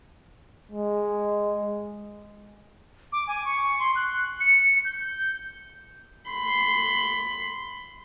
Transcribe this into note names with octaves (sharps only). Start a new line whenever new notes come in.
G#3
D6
G#5
C#6
C6
F#6
C#7
G6
B5 C6